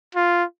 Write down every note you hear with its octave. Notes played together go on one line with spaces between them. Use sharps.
F4